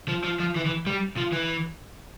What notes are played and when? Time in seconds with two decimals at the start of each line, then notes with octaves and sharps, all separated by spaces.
0.08 F3
0.24 F3
0.40 F3
0.56 E3
0.66 E3
0.87 G3
1.18 F3
1.33 E3